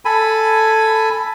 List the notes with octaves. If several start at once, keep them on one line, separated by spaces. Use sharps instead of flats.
A4 G#5 B5